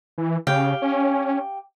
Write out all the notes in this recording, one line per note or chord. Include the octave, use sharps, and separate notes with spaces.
E3
C#3 G4 F5 G5
C#4